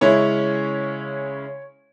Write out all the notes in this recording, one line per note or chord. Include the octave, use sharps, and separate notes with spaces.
C#3 G#3 C#4 E4 C#5